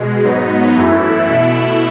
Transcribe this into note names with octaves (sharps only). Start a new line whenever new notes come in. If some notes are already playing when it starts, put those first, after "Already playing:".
Already playing: B2 G#3
G#2 F#3 B3 D#4
F#2 E3 A3 E4
B2 A3 E4